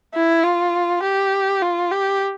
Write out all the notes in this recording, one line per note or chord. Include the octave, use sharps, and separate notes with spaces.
E4
F4
G4
F4
G4